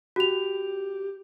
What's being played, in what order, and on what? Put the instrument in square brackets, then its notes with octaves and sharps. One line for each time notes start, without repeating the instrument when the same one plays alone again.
[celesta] F#4 F7 [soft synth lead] G4